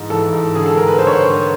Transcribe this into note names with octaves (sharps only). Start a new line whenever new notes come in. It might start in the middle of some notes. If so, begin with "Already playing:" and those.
Already playing: G#2 E3
E3 A4
G#2
D3 G#4
A4
G2 A#4
B4
D3 C5
C#5
C5
G2